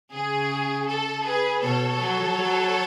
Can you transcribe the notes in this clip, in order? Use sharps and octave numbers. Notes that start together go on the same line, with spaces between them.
C#3 G#4
A4
G#4 B4
B2 A4 C#5
F#3
F#3